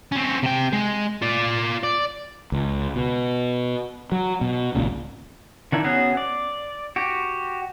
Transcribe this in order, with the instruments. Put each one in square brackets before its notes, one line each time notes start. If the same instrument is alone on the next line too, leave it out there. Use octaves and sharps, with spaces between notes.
[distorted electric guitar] C4 C#4
C3 G5
G#3
F4 D5
D5
[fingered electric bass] C#2
B2
F#3
B2
G#1 C#2 A#2 C#3
[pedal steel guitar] D#3 D4 E4
B3 C#4 F#4 G#4 E5
D5
F#4 G4